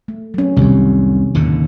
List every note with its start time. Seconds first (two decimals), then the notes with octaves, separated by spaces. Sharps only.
0.08 A3
0.34 F#3 C#4
0.57 C2 F2 C3 D#3
1.35 D#2 A2 D3